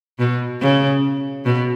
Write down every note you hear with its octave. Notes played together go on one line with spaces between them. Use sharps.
B2
C#3
B2